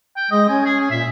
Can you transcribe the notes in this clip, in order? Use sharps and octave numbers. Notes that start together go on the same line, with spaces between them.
G5
G#3 D#5
C#4 G#5
G#4
G#4
A#2 E5